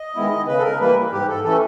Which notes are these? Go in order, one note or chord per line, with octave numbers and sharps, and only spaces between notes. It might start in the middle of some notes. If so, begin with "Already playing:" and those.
Already playing: D#5
D#3 G#3 B3 E4
C#3 B4
A4
A#4
E3 G3 A#3 B4
G#2 G4
A4
E3 A3 C#4 A4